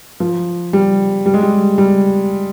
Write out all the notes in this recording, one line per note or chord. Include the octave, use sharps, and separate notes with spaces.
F3
G3
G3
G#3
G3
G3